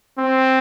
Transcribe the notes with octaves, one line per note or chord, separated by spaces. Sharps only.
C4